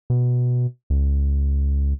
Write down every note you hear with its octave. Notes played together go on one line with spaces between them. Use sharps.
B2
C#2